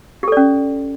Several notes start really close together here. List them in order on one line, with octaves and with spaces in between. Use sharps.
G4 A4 D5 C#4